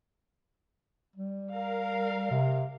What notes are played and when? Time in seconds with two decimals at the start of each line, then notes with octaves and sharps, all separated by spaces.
1.16 G3
1.52 A#4 F5
2.31 C3